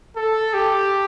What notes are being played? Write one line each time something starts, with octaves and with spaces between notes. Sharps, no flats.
A4
G4